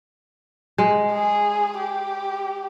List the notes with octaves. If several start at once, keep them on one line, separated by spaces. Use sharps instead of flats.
G#3
G#4
G4